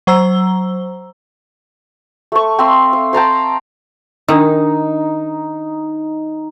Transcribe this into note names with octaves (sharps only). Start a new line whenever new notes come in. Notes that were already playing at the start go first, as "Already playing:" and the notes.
F#3 C5 A#5 E6 G7
A3 C#6
C4 E5 F5 C6
F5
G5 A5 A#5 C6
D#3 D4 D#4 D#6 E6